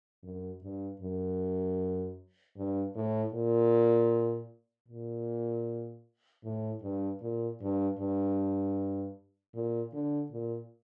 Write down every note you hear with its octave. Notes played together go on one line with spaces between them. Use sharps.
F#2
G2
F#2
G2
A2
A#2
A#2
A2
G2
A#2
G2
G2
A#2
D3
A#2